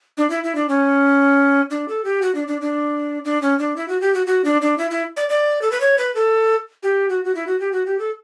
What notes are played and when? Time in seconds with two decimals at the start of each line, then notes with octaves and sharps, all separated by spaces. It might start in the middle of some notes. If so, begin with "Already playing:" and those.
0.17 D4
0.30 E4
0.44 E4
0.55 D4
0.69 C#4
1.70 D4
1.88 A4
2.05 G4
2.22 F#4
2.35 D4
2.47 D4
2.61 D4
3.25 D4
3.42 C#4
3.59 D4
3.76 E4
3.88 F#4
4.01 G4
4.15 F#4
4.26 F#4
4.44 D4
4.62 D4
4.78 E4
4.91 E4
5.17 D5
5.29 D5
5.62 A4
5.72 B4
5.80 C#5
5.98 B4
6.15 A4
6.83 G4
7.09 F#4
7.25 F#4
7.35 E4
7.47 F#4
7.60 G4
7.72 F#4
7.86 G4
7.99 A4